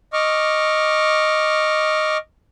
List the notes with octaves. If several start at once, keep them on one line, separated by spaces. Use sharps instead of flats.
D#5 C#6 D6 F6